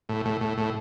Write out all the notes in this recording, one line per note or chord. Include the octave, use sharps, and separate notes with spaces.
A2
A2
A2
A2